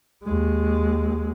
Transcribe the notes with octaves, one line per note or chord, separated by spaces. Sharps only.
D#2 G#3